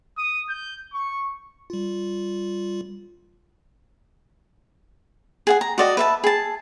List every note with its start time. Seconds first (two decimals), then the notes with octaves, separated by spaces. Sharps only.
0.18 D#6
0.49 G6
0.93 C#6
1.70 G3 F4
5.47 G#4 F#5 G#5
5.61 A#5
5.78 F#4 D5 D#5
5.97 B4 E5 A5
6.24 G#4 A5